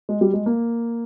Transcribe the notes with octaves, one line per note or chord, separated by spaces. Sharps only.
G#3
G3
G#3
A#3